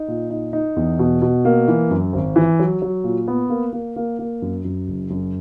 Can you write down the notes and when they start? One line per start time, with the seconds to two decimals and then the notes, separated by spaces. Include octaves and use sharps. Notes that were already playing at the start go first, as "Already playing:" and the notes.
Already playing: D#4
0.08 A#2
0.30 D#4
0.53 D#4
0.76 E2
0.99 B2
1.22 B2
1.45 A#3
1.68 E3
1.91 F#2
2.13 G#1
2.36 E3
2.59 F#3
2.82 F#3
3.04 A#2
3.28 B3
3.50 A#3
3.73 A#3
3.96 A#3
4.19 A#3
4.42 F#2
4.65 F#2
4.87 F#1
5.10 F#2